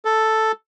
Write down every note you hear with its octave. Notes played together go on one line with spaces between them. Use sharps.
A4